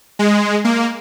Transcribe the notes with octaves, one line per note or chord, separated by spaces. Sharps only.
G#3
A#3